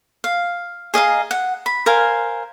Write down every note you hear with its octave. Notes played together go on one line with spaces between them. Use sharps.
F5
G#4 D#5 F5 A#5
F#5
B5
A#4 C5 F5 G#5